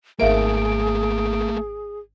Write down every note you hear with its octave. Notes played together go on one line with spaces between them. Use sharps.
G#1 A3 A#3 G#4 A#4 E5 F5 D7